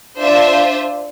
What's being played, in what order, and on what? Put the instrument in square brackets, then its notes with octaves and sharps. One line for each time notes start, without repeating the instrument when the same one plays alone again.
[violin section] D4 F4 C5 E5